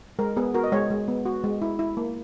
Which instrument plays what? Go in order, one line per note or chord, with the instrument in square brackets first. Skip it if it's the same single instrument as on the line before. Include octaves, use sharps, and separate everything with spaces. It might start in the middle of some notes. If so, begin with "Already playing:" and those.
[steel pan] G#3 A#4
B3 G#4
F#4 A#4
D#5
G#3 C#5
G#3
B3
F#4
G#3
E4
E4
A#3